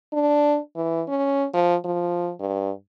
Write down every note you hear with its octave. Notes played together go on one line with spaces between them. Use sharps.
D4
E3
C#4
F3
F3
G2